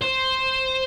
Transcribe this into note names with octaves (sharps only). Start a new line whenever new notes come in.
C5